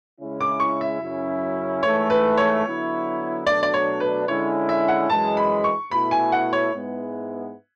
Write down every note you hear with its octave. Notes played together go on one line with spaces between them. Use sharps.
C#3 G#3 C#4 E4
D6
C#6
E5
F#2 C#3 F#3 C#4 E4
G#2 E3 A3 C#5
B4
C#5
D3 F#3 B3 E4
B2 F#3 A3 D4 D5
D5
C#5
B4
D3 G#3 C#4 E4 C#5
E5
F#5
F#2 E3 G#3 A5
B5
C#6
B2 A3 E4 B5
G#5
F#5
C#5
G#2 G#3 B3 E4